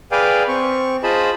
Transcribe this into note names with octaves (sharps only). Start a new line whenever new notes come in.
G#4 B4 D5 F5 G5 G#5
C4 C#6
F4 G#4 C5 D#5 A5 B5